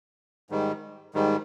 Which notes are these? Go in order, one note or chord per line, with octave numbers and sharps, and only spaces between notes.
G#2 D#3 G3
G#2 D#3 G3